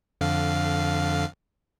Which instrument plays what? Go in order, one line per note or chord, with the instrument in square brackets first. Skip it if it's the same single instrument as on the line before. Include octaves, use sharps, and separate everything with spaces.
[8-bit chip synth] F2 D3 F5